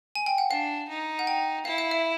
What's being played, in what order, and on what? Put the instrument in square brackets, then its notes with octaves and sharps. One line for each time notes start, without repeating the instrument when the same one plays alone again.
[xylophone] G#5
G5
F#5
[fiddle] D4 [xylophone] F5
[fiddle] D#4
[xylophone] F#5
G5
[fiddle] E4 [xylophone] F5
[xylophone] F5
E5